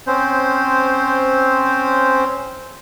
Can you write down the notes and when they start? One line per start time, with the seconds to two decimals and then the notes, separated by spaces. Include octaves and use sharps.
0.07 C4 C#4 C5